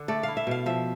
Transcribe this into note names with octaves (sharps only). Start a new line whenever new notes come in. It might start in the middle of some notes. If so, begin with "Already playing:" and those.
Already playing: D3 D4
A3 D5
E4 F5
E5
B2 F5
F3 E5